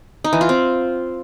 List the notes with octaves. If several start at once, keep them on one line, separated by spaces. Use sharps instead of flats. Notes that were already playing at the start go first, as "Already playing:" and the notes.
D#4
E3
F4
C4